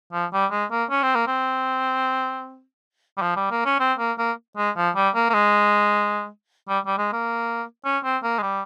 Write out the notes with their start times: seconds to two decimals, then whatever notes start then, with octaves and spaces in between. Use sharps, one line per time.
0.12 F3
0.32 G3
0.51 G#3
0.71 A#3
0.89 C#4
1.02 C4
1.15 A#3
1.27 C4
3.17 G3
3.22 F3
3.36 G3
3.51 A#3
3.65 C#4
3.79 C4
3.98 A#3
4.18 A#3
4.57 G#3
4.76 F3
4.95 G3
5.15 A#3
5.29 A#3
5.34 G#3
6.68 G3
6.86 G3
6.98 G#3
7.12 A#3
7.85 C#4
8.04 C4
8.23 A#3
8.38 G#3
8.42 G3